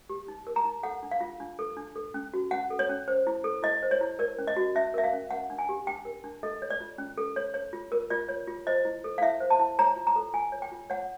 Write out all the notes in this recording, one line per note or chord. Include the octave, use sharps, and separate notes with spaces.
G4
D#4
A#4
A#5
D#4
A4 F#5
D4
F5
F4
D4
A4
D4
A4
C#4
F#4
C#4 F#5
A4
C#5
C#4
C5
E4
A4
E4 D#5
C5
C#5
E4
A#4 D5
C#4
D#5
F#4
C#4 E5
A#4 E5
F5
C#4
A#4 F#5
D4
G#5
G4
D4 G5
A#4
D4
A4 D#5
C#5
D5
F4
C#4
A4
C#5
C#5
F4
A#4
F4 D5
C#5
F4
C5 D#5
E4
A4
F5
E4 E5
C5
A5
E4
C#5 A#5
F4
A#5
A4
F4 G#5
C#5
G5
F4
C#5 F#5